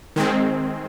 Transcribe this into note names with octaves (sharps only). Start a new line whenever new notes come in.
D#3 G#3 C4